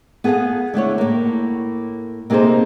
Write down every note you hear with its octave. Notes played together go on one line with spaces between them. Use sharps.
B3 G#4 A4 B4 F5 F#5
D3 A3 E4 C#5
A2 A#3
C3 A#3 D#4 G#4 A4 C5